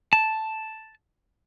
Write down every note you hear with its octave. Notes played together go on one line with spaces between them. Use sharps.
A5